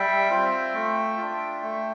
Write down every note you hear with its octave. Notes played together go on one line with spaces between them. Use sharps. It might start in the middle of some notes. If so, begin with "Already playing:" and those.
Already playing: G3 E5 G5
C4 F4
A3
D4 F4
A3